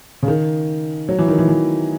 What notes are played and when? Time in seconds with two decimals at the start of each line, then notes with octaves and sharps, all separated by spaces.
0.23 C#3
0.28 D#3
1.09 F#3
1.19 E3
1.28 D#3
1.38 E3
1.48 E3